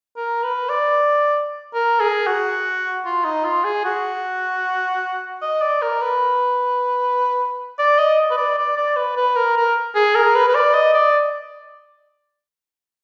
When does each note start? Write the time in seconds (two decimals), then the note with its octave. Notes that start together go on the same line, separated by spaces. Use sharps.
0.16 A#4
0.43 B4
0.69 D5
1.74 A#4
2.00 G#4
2.27 F#4
3.05 F4
3.25 D#4
3.45 F4
3.64 G#4
3.85 F#4
5.42 D#5
5.61 D5
5.82 A#4
6.01 B4
7.79 D5
7.98 D#5
8.31 B4
8.37 D5
8.58 D5
8.77 D5
8.96 B4
9.17 B4
9.36 A#4
9.56 A#4
9.95 G#4
10.15 A#4
10.35 B4
10.48 B4
10.55 D5
10.74 D#5
10.94 D5